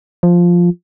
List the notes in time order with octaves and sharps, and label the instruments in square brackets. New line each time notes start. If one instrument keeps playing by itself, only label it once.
[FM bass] F3